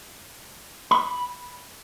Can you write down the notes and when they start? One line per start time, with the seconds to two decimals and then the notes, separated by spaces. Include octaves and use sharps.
0.91 B5